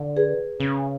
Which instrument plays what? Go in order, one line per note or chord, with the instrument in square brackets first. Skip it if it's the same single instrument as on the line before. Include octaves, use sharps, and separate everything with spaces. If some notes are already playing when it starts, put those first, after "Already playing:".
Already playing: [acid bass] D3
[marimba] G#4 B4
[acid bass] C#3 [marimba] C#4